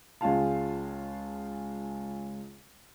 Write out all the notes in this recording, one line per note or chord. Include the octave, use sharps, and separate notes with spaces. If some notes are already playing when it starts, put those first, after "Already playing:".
C#2 G#3 C#4 F4 F5 A5